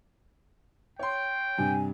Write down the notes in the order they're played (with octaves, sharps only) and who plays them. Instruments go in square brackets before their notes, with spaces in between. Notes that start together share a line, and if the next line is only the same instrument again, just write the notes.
[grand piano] C#5 C6 [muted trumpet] G5
[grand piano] G2 C3 D4 [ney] G#5